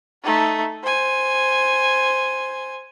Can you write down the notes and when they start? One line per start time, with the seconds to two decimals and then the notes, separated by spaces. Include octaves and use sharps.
0.23 A3 D#4
0.82 C5 G#5